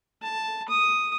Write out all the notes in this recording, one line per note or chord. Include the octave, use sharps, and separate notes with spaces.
A5
D#6